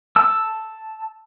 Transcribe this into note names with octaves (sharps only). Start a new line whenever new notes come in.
A5 E6